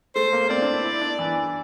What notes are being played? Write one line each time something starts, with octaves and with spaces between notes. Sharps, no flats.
A3 C5
A#3
A#3
C4 D5
D4
E4
E4
D4
E3